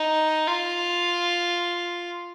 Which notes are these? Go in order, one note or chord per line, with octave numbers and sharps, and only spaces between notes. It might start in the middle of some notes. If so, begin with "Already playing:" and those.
Already playing: D#4
F4